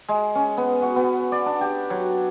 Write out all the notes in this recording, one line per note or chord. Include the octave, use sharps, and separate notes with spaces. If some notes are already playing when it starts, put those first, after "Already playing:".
G#3
C#4
B3
F#4
B3
D5
D4
G4
F#3